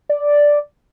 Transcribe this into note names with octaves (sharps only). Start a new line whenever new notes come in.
D5